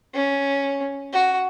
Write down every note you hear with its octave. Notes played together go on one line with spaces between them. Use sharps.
C#4
F#4